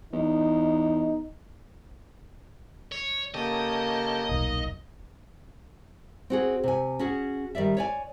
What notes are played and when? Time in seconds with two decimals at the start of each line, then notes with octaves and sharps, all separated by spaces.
0.13 E2 D#4
2.92 C#5
3.34 C#3 A#3 G4 A4 D#5
4.29 D#1 B1 D#4
6.30 C4 F#4 G#4
6.64 C3 G#5
6.99 C#4 F#4 G#4
7.55 D#3 G3 D5 E5
7.77 C#5 D5 G#5